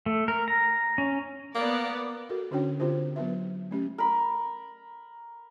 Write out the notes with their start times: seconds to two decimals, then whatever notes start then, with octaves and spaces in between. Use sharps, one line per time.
0.06 A3
0.28 A#4
0.48 A#5
0.98 C#4
1.55 A#3 B3 D5
2.29 F#4 A4 A#4
2.51 D3 C#4 D4 F#4 C#5 G5
2.80 D3 C4 F4 G4 C5
3.16 F#3 B3 B4 E5
3.71 A3 C#4 G4
3.98 A#4 B5